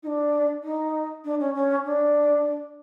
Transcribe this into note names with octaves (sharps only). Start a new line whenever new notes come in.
D#4
D4
D#4
D4
C#4
C#4
D4